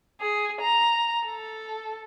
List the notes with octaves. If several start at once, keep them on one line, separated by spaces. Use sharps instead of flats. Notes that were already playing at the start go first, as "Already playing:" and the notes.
G#4
A#5
A4